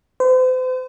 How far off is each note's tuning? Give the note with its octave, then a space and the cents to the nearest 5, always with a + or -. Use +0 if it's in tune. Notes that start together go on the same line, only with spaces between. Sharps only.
C5 -40